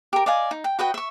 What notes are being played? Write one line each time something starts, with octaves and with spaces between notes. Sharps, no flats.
G4 A#4
D5 D#5 F5 G#5
D#4
G5
F#4 B4 D#5 G5
E5 C#6